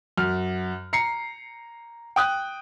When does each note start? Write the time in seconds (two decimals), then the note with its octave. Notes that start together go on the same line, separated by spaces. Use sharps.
0.18 F#2 F6
0.93 A#5 C7 C#7
2.16 G5 D#6 F#6